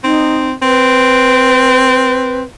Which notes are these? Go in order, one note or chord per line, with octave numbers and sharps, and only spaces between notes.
C4 D#4
C4 B4